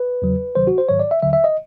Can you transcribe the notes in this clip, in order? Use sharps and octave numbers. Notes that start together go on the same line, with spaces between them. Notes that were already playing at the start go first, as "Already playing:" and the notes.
Already playing: B4
E2 C#3 F#3
D2 C3 D#3 F#3 C5
F#4
C5
G#2 D#3 F#3 C#5
D5
E5
D#2 D3 F#3 E5
E5
D#5